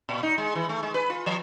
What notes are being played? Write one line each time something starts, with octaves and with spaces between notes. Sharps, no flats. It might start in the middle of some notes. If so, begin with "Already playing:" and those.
A#2
D#4
G#3
E3
A3
G#3
B4
F4
F3